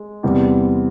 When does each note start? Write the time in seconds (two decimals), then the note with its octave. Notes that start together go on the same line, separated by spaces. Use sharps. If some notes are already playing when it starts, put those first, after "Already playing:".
Already playing: G#3
0.23 E2 C3 G3